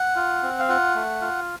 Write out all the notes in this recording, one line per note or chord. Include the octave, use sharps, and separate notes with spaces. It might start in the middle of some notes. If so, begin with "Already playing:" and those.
Already playing: F#5
F4
C4
F5
F4 F#5
A3
F4